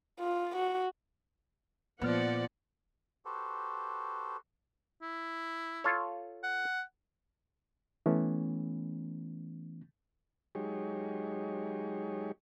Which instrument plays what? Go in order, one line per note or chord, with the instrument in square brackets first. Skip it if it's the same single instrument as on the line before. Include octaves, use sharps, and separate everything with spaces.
[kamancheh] F4
F#4
[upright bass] A#2 [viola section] F3 D5 F#5 [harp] B3 F6
[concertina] F#4 G4 A4 B4 C5
[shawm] E4
[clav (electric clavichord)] F4 A4 C#5
[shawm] F#5
[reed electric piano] E3 A3 B3 C#4
[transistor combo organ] F#3 G#3 D#4 G4 G#4 C#5